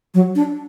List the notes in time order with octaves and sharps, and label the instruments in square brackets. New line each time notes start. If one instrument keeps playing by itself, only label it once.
[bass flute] F#3
D4